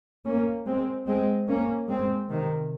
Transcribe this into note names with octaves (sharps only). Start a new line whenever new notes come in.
A#3 C#4
G#3 C4
G#3 C4
A#3 C#4
G#3 C4
C3 D#3